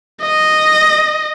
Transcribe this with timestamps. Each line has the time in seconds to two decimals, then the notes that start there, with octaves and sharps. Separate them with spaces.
0.22 D#5